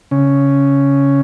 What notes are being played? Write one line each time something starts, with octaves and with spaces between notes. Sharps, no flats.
C#3 C#4